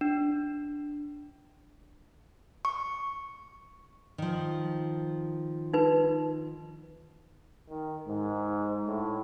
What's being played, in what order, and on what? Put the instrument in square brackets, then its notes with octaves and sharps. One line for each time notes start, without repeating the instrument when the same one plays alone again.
[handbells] D4
[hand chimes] C#6
[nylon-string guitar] D#3 F3
[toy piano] D#4 B4
[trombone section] D#3
G#2
A2